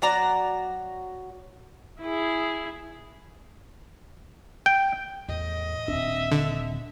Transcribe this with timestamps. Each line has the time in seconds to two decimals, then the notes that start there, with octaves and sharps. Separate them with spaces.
0.02 F#3 F#4 D5 A#5
2.01 E4 G#4
4.66 G5
5.28 E2 A2 D#5
5.88 D#1 C4 D4 E5
6.32 D3